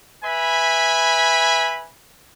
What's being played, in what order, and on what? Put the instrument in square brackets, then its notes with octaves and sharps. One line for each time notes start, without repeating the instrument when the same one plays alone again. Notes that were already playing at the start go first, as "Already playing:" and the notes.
[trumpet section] B4 E5 G#5 B5